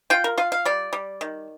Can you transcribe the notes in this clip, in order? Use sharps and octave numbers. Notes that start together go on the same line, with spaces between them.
F4 G5
A#4
F4 F5
F5
G3 D5
G3
D#3